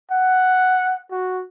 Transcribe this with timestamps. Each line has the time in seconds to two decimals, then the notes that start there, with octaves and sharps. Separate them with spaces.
0.11 F#5
1.11 F#4